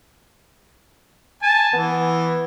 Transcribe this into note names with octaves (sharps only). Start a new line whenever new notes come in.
G#5 A5
E3 B3